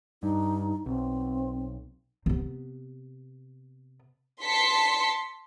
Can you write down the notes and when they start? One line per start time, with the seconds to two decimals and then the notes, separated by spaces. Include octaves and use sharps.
0.23 G2 D#4
0.86 B1 C4
2.26 C3 B3
4.44 A5 C6 B6 C#7